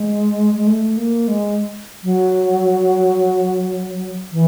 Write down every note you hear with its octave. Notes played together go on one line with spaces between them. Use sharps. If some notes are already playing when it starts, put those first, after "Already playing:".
Already playing: G#3
G#3
A3
A#3
G#3
F#3
E3